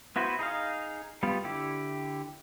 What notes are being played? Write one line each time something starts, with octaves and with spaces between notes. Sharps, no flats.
B3 E4 F#4 B4 C5
D#4 G#4 D#5 F5
G3 B3 F4
D3 E4 G4